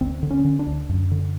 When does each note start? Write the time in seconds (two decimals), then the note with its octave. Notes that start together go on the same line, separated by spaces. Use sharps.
0.01 D2 C4
0.23 D3
0.31 C#4
0.45 D3
0.59 D4
0.67 D2
0.89 F#2
1.11 D3